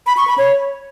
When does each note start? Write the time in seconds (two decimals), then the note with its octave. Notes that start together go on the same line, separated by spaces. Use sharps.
0.07 B5
0.17 C#6
0.27 B5
0.38 C#5